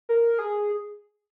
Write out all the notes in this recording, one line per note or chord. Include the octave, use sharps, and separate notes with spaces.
A#4
G#4